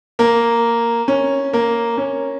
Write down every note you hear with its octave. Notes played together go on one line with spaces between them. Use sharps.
A#3
C#4
A#3
C#4